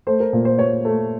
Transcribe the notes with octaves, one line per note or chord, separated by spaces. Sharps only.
A3 C5
A#4
A#2
C5
A#2 C#5
A3